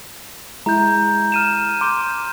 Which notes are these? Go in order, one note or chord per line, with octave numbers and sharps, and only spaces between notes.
G#3 E4 A#5 G6
F6 D#7 E7
C6 D6 G6